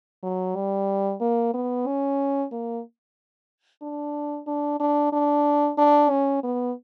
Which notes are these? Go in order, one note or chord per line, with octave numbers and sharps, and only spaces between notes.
F#3
G3
A#3
B3
C#4
A#3
D4
D4
D4
D4
D4
C#4
B3